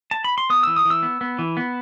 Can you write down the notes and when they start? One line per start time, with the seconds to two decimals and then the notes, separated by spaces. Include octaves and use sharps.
0.11 A5
0.24 B5
0.38 C6
0.50 B3 D#6
0.63 E3 E6
0.76 D#6
0.85 E3
0.90 E6
1.03 B3
1.21 B3
1.39 E3
1.57 B3